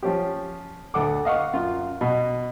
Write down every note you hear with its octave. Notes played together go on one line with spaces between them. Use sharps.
F3 C#4 G4
D2 A4 F#5 D6
D#5 F5 F#5 C#6
F#2 F4
B2